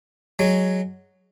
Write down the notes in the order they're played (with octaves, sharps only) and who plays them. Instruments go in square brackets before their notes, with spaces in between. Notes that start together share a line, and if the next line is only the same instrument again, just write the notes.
[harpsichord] F#3 G#3